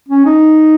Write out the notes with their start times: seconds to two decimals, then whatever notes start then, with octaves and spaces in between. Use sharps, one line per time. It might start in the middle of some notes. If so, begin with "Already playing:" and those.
0.09 C#4
0.26 D#4